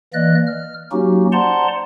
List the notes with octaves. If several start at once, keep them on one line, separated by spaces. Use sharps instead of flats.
E3 A#3 D5 D#5 F#6
F6
F#3 A#3 C#4 D#4 F#4 G4
C5 D5 F#5 A5 A#5 C6